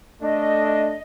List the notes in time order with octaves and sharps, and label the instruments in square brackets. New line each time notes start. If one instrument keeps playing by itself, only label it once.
[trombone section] A3 D4 [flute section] D#5